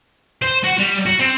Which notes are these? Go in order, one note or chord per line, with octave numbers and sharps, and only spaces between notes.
C5
F#4
G3
F#4
C4